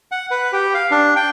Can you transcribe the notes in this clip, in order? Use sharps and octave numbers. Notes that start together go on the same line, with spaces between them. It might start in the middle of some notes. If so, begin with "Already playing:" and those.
F#5
B4
G4
F5
D4
G5